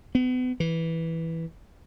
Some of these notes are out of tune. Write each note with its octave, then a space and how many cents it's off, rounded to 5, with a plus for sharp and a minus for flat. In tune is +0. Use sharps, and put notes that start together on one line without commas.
B3 +35
E3 -5